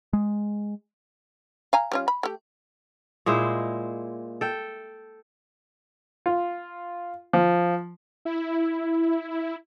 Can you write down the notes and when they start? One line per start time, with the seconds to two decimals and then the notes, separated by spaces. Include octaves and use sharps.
0.13 G#3
1.73 F5 G#5 A#5
1.92 G3 C#4 F4
2.08 B5
2.23 A3 G4
3.26 A#2 G#3 E4 C5
4.41 A4 G5
6.26 F4
7.33 F3
8.25 E4